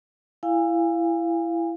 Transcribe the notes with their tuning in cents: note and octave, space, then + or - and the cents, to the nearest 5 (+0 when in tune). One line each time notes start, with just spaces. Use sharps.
E4 +20 F5 +0 G#5 -30